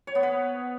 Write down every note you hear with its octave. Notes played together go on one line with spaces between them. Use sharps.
C#5
B3
B4